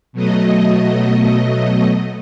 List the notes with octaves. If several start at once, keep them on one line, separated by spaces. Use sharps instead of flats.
B2 F#3 A3 D#5